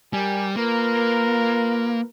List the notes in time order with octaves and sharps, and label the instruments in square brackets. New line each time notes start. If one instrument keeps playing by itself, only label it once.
[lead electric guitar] G3 [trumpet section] G4 A#4 G#5
[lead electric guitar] A#3 [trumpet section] F4 A#4 B4